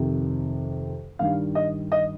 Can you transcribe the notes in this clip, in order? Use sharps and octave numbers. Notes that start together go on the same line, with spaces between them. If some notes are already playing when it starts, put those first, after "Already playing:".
Already playing: F2 C3 D#3
G2 D#3 G3 F5
D#5
D#5